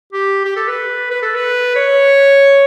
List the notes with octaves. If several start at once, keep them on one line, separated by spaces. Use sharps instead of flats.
G4
G4
A4
B4
B4
A4
B4
C#5